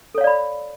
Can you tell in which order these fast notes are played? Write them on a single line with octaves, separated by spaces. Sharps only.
A4 C#5 F5 D5 B5